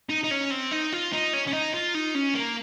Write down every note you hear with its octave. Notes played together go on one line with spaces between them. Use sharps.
D#4
D#4
C#4
C4
D#4
F4
D#4
C#4
C#4
D#4
F4
D#4
C#4
A#3